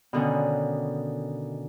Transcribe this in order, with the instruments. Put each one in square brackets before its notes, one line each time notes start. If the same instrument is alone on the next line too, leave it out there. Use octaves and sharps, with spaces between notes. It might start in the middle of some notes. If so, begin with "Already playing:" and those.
[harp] B2 D3 D#3 C#4